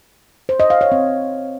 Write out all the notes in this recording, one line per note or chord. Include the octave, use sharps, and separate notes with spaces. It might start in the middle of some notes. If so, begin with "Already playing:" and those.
C5
D#5
F5
C#5
C4